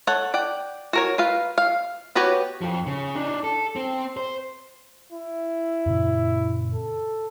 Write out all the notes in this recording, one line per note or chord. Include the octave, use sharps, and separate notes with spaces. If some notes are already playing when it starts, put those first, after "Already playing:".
A4 C#5 F#5
D5 F#5 G5
F#4 A#4 C#5
F4 B4 F5
F5
B3 F#4 G4 B4 C#5
F2 F3
C#3
D4 D#4
A4
C4
C5
E4
F#2 A#2 C#3
A4